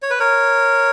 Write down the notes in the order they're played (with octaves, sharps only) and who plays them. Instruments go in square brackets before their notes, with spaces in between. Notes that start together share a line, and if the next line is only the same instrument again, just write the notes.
[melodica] C#5
B4
A#4 C#5